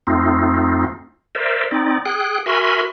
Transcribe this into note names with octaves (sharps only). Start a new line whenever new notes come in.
F2 A3 C4 D#4 F4
A#4 C5 D5 E5
C4 D#4 D5
G#4 G5 F#6
F#4 A#4 E5 G#5 B5 C6